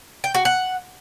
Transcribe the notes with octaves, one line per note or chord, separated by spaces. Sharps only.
G5
F#4
F#5